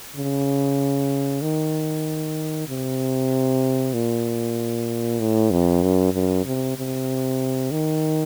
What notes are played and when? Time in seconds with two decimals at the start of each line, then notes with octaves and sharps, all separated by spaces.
0.16 C#3
1.42 D#3
2.68 C3
3.94 A#2
5.20 A2
5.51 F2
5.83 F#2
6.14 F#2
6.45 C3
6.77 C3
7.71 D#3